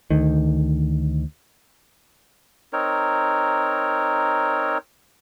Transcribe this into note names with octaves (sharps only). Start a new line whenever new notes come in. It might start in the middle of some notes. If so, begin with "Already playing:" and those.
D2 D#3
C4 D#4 A#4 C#5